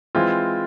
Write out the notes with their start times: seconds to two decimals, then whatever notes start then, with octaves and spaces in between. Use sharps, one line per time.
0.15 E3 G#3 C4 F4